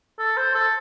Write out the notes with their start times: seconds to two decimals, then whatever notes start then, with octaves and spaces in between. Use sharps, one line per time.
0.19 A4
0.37 C5
0.55 A4